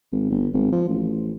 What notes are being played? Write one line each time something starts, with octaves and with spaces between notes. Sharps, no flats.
G#1
G1
G#1
F3
A1